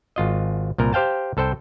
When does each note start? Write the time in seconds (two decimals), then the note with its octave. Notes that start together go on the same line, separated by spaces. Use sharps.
0.16 G#1 F4 D#5
0.78 C2 A#2 A#4
0.93 G4 C5 F5 G5 A5
1.37 C2 A4 C5 G5